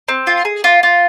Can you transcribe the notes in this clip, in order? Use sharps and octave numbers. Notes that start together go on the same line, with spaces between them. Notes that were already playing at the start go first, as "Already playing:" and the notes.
C4
F4
G#4
F4
F4